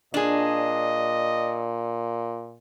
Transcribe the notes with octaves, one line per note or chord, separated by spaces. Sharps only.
A#2 D4 G#4 D#5